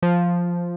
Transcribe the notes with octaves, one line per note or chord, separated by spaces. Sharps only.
F3